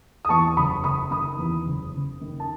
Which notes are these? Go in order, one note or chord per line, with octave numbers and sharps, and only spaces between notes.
D#6
E2 A5 C#6
F#1 B5 D#6
F#1 B5 D#6
D#3 B5 D#6
E2
F#1
F#1
D#3
A5